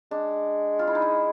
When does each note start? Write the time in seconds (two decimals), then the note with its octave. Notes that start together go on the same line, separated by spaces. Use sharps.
0.11 G#3 D4
0.79 F4
0.87 E4
0.95 D#4
1.02 E4